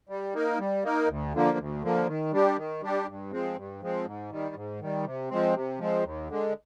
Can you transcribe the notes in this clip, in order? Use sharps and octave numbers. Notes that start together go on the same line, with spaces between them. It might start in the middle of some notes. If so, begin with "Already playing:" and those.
G3
A#3 D#4 A#4
G3
A#3 D#4 A#4
D2
D3 F3 A#3
D2
D3 F3 A#3
D#3
G3 D4 G4
D#3
G3 D4 G4
G2
F3 G#3 C4
G2
F3 G#3 C4
G#2
D#3 G3
G#2
D#3 G3
C3
F3 G#3 C4
C3
F3 G#3 C4
D#2
D3 G#3